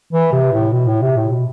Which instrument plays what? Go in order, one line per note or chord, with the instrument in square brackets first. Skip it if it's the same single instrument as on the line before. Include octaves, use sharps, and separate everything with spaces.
[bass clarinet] E3
C3
A2
B2
A2
C3
A2
B2